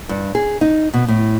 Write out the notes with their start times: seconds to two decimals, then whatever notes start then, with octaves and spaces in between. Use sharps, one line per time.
0.09 G2
0.35 G#4
0.61 D#4
0.94 B2
1.08 A2